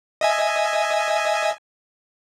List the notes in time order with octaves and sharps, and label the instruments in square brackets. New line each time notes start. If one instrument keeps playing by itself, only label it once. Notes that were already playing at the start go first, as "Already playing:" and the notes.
[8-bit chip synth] D#5 E5 G#5